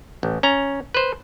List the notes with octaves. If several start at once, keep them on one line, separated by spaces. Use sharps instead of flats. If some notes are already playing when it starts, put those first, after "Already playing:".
A1
C#4 A#5
B4 C5